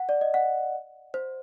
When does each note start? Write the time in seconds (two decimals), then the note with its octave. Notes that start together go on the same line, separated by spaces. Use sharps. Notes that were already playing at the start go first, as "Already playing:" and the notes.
Already playing: F#5
0.09 D5
0.21 D#5
0.34 F#5
1.14 C5